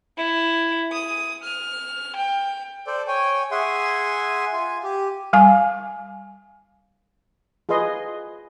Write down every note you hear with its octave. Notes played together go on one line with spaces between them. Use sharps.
E4
D#6
F6
G5
A4 C5 D5
C#5 G5 G#5
G#4 E5 F#5 G#5 C6
F4 G#5
G4
G3 F5 G#5
F4 G#4 B4 D#5 C6